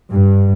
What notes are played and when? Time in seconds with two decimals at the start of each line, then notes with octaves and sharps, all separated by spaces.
0.10 G2